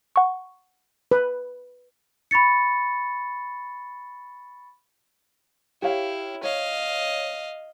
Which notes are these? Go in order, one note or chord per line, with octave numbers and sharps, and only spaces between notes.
F#5 C#6
B4
B5 C#6 A6 C#7
E4 G4 C#5 F5
C#5 D#5 F5